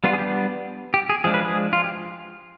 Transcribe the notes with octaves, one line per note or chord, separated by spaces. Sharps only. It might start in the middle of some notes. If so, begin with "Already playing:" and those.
G3 B3 D4 F4
G#4
G4
G4
G#4
F3 G#3 D4 G#4
B4
G#4
F4
G4